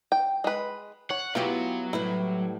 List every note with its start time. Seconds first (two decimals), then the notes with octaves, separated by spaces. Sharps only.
0.12 G5
0.44 G#3 B4
1.10 C#5 F#5
1.35 F#3 B3 E4 F4 G4
1.93 A2 G3 E4 B4